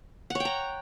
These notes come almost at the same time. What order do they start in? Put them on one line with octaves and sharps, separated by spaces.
F#5 C#5 G5 A#5